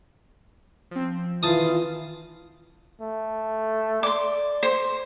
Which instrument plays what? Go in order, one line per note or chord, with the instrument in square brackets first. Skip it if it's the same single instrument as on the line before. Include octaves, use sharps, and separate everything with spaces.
[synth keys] F3 C4
[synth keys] D#3 [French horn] E3 [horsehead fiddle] F4 [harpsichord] A5 D#6
[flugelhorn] A3
[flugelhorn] D5 [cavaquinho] C6 D6
[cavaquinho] C5